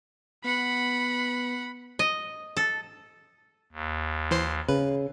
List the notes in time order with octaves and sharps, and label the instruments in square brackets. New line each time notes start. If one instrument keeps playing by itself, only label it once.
[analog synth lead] B3 [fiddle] F#5 [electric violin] B5
[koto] D#5
A4
[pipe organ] D#2
[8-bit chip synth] E3 C5 C7
[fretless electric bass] C#3 [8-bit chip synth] B4